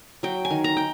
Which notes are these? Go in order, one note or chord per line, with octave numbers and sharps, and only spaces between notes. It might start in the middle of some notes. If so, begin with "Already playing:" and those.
F#3 G5
G#5
D#3
A#5
G5